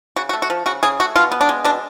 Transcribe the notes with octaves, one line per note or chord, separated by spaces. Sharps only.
C#3 F#4
F#4
A3
F#4
F3
C#3 F#4
C#3 G#4
A3 F#4
B2 F4
B3
D4
G#3
B2 D4